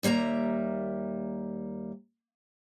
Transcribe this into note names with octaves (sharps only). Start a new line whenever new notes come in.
D#2 G3 A#3 E5 A#5